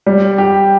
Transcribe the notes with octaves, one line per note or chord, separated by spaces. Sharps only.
G3
G4